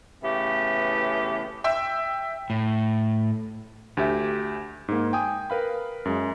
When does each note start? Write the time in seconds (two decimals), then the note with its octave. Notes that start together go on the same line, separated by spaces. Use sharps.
0.24 A2 C#3 E3 B3 G4
1.64 E5 G5 E6
2.50 A2
3.97 D2 G4 E5
4.88 G#2 A#3
5.13 G5 G#5 D#6
5.50 A#4 B4 F5 B5
6.05 F#2 G#3